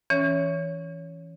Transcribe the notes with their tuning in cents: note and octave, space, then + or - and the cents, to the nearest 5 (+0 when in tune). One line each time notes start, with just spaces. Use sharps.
E3 +0 C#4 +5 C#5 +15